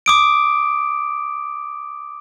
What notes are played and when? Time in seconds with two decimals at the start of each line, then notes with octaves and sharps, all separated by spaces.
0.06 D6 D#6 D7